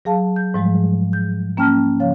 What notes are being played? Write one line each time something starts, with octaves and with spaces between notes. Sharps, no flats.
F#3 G#4 F5 A5
G6
G#2 F3 G3 G#3
G6
A#3 C#4 G5 A5 F6
C#3 F3 C#5 F5